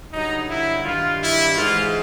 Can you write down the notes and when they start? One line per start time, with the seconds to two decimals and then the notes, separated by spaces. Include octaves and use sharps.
0.11 G2 D3 F#3 D#4
0.48 E4
0.84 G2 D#3 G3 F4
1.20 E4
1.55 G#2 E3 G#3 F4